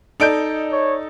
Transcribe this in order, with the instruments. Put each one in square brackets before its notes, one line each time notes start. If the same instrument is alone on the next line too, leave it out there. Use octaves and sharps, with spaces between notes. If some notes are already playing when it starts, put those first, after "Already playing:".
[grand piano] D#4 A4 D7 [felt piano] D5 D#5 G6
[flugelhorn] C#5